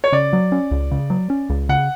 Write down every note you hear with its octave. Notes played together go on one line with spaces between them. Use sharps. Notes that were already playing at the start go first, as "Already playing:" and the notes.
C#5
C#3 D5
F#3
C#4
C#2
C#3
F#3
C#4
C#2
C#3 F#5